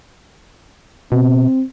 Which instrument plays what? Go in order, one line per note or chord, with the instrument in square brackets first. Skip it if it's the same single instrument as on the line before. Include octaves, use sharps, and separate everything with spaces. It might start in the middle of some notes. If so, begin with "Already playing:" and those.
[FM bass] B2 [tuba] C4